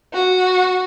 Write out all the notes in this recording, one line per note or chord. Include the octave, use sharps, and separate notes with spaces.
F#4